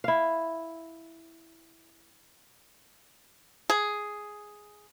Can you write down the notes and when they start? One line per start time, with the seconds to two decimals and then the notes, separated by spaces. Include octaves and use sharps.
0.04 E4 F5
3.70 G#4